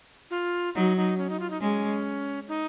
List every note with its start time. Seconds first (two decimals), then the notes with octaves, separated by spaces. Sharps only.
0.31 F4
0.75 F#3 D#4
0.97 D#4
1.18 C#4
1.30 D#4
1.40 F4
1.50 D#4
1.61 G#3 C#4
2.48 D#4